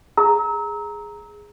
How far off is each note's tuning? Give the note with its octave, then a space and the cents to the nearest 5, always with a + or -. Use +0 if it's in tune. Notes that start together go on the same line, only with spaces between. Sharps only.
G#4 +0 A#5 +0 E6 -35